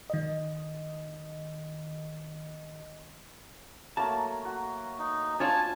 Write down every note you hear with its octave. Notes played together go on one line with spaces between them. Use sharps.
D#3 D#5
F#3 A3 A#3 A5
F#4
D#4
D4 F4 C#5 G#5 A5